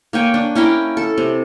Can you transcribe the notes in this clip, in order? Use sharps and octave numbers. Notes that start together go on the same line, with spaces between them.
A#3 C#5 G5 G#5
D4
C#4 E4 A#4 G5
A4
C3